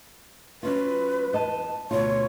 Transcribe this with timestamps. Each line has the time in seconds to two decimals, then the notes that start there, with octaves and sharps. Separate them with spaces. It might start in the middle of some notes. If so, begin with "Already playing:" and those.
0.63 F#3 C#4 F4 B4
1.33 E2 D#5 A5
1.91 D2 B2 F4 C#5